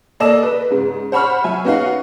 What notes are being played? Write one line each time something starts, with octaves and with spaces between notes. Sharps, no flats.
A#3 A4 D5 D#5 E6 E7
B4
G#2 C#3
C5 F#5 B5 C#6 F6
F#3 E5 G#5
B3 C#4 D#4 F#4 F5 F#5